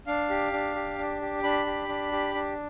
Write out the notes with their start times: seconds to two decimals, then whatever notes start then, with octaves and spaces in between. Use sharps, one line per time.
0.07 D4 F5
0.30 G4
0.53 D4
0.75 G4
0.98 D4
1.21 G4
1.43 D4 B5
1.66 G4
1.89 D4
2.12 G4
2.35 D4